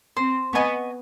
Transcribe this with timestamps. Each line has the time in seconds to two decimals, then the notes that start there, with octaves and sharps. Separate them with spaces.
0.17 C4 C5
0.53 B3 D#5 G#5 C#6